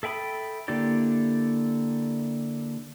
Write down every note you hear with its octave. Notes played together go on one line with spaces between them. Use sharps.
A4 E5 G5 B5 D#6
D3 A#3 E4 G4 D5